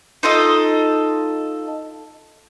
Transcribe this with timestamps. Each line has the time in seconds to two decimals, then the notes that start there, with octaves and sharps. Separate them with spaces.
0.23 D#4 F4 A4 D#5